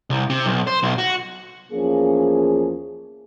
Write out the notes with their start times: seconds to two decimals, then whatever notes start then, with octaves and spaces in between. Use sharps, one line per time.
0.10 C2
0.30 C3
0.46 B1
0.67 C5
0.83 B1
0.98 F#4
1.72 E2 F3 A#3 C#4 G#4